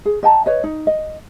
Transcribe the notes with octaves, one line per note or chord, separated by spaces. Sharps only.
G#4
D#5 G5 A5 A#5
B4 C#5 D#5
D#4
D#5